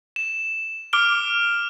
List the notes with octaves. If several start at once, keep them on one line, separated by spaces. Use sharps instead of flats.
E7
D6 F6 D7 G7